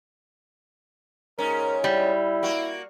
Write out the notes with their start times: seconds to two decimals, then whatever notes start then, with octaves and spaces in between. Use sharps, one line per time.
1.38 G#2 C#4 A#4
1.84 G3 E4
2.43 A#3 F#4